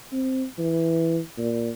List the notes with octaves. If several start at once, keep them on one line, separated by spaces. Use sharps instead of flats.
C4
E3
A#2